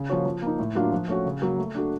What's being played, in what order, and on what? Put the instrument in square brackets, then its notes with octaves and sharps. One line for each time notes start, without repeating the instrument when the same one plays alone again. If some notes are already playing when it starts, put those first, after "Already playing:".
Already playing: [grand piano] C#3
F3 A#3 C#4 F#4
F3
A#3 D#4
A2
F#3 A#3 D4 F4
F3
A3 C#4 F#4
C#3
F#3 A#3
A3
D4 F#4 A4